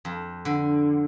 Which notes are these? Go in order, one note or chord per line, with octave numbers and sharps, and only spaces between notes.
F2
D3